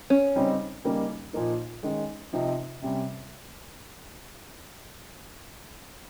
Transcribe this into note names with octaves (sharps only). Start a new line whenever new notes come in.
C#4
C#3 G3 C4 D#4
C#3 G3 A#3 D#4
A#2 F3 A#3 D#4
D#3 G#3 C#4
C3 F3 C4 D#4
C3 G3 C#4